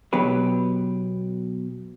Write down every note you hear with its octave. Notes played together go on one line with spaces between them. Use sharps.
B2 F#3 B3 G4 B4